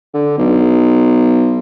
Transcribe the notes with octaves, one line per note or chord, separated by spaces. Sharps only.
D3
B1